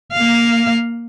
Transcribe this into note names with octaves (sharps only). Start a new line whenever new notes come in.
A#3 F5